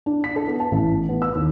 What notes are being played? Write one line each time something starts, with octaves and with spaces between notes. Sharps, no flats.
D4
B6
A4
B3
A5
A1
B3
E6
D#2